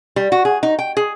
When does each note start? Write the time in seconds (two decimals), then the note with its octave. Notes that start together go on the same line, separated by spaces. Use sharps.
0.16 G3
0.32 F#4
0.45 G#4
0.63 D#4
0.79 G5
0.97 G#4